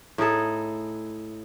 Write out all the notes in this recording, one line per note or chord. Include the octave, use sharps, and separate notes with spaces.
A2 D#4 G#4 A4